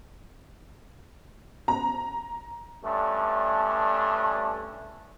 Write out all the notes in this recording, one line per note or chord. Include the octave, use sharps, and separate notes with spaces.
A#5
G2 A3 C#4 D4